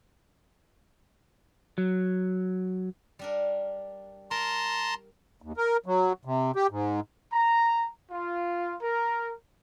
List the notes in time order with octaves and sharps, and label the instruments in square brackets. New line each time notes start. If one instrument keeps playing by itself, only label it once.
[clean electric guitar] F#3
[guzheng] G3 D4 A#4
[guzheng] A#4 [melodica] A5 A#5 C6
[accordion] D#2
A#4
F#3
C3
G4
G#2
[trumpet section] A#5
F4
A#4